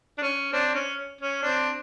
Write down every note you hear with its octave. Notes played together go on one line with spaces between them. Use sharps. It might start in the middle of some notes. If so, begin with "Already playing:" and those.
D4
C#4
C4 D4
C#4
C#4
C4 D4